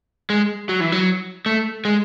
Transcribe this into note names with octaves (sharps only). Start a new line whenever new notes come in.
G#3
F#3
E3
F#3
A3
G#3